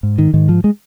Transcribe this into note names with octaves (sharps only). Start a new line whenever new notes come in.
G#2
D#3
G#2 D#3
F3
G#3